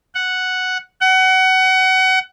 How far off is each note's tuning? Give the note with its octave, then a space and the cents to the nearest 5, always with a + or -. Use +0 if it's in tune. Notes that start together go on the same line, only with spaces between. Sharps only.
F#5 +0
F#5 +25